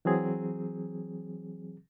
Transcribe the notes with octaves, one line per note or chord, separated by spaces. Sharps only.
E3 F#3 C4 G#4